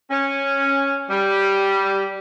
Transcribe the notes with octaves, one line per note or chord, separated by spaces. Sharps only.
C#4
G3